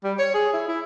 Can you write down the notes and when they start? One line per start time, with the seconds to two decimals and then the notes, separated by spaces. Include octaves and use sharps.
0.04 G3
0.19 C#5
0.34 G#4
0.53 E4
0.68 E4